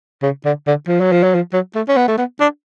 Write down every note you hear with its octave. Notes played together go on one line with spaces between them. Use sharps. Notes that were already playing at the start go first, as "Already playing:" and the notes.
C#3
D3
D3
F3
F#3
F3
F#3
F3
F#3
A3
C#4
B3
A3
B3
D4